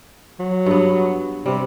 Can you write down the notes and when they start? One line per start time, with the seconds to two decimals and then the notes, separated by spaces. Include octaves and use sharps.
0.39 F#3
0.66 G2 B3
1.46 C3 G3